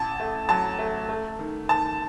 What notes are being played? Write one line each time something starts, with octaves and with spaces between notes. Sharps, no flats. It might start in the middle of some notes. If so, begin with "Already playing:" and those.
Already playing: A1 A5
A3
F#3 A5
A3
A3
D#3
D#3 A5